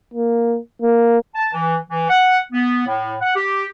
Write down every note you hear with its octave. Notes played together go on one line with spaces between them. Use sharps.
A#3
A#3
A5
E3
E3
F#5
B3
A2
F#5
G4